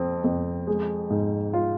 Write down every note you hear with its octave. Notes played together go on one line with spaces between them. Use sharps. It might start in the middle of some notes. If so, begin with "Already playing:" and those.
Already playing: F2 C4
F2
G#3
G#2
F4